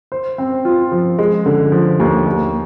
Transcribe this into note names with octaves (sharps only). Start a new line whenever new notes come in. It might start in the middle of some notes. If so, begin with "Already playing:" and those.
C5
C4
F4
F3
G#3
D3
F3
D#2
D#2